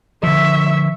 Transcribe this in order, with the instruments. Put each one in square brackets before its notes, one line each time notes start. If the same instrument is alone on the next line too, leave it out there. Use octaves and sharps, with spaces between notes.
[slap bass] D3 F3 [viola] E5 C#6